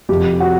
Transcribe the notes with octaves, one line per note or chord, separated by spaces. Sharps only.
F2 C3 F3 G4
F#4